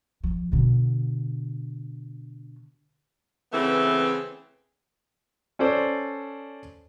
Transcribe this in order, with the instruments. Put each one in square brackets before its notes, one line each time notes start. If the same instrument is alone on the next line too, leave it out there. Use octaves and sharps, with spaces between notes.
[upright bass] F3
B2 D3
[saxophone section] C#3 E3 A3 B3 C4
[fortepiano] C#4 A4 C5 D5